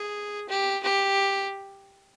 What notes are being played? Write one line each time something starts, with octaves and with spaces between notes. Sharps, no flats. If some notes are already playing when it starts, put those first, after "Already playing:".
Already playing: G#4
G4
G4